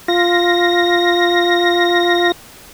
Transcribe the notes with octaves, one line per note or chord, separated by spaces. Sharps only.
F4 A#6